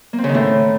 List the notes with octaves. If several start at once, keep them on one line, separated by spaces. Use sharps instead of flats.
A#3
C4
C#3
D#3
A2